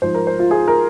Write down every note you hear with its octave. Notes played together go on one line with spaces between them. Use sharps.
G#2 F3 C5
A#4
C5
F4
G#4
A#4